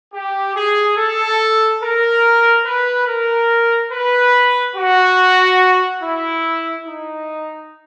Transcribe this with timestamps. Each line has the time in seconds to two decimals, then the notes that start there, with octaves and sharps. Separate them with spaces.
0.14 G4
0.55 G#4
0.98 A4
1.82 A#4
2.66 B4
3.07 A#4
3.92 B4
4.75 F#4
6.02 E4
6.85 D#4